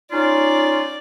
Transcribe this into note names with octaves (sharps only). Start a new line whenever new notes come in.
C#4 D#4 F4 D5